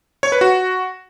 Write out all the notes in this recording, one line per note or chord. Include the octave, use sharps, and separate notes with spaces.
C#5
B4
F#4